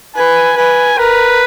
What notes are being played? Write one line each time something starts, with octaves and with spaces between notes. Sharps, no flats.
B4 G#5
B4 G#5
A#4 B4